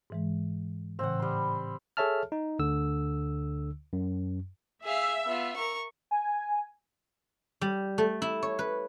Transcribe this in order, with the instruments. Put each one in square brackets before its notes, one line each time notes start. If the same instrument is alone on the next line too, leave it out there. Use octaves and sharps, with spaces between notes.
[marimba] G#2 E3 G#3
[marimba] A2 C#3 E3 [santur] C4 F#5
[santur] G3 C6
[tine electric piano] G#4 A4 C#5 E5 A5 F6
D#4
D2 D3 E6
F#2
[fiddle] G#4 F5 [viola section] E5
[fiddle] B3 F4
A#4 C#6
[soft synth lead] G#5
[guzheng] G3
A3
E4
C#5
B4